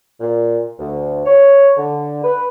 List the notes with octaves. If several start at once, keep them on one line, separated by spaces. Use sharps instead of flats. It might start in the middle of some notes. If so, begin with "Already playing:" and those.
A#2
D2
C#5
D3
B4